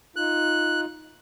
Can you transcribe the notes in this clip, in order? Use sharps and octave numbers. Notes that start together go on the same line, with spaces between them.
D#4 F4 F#6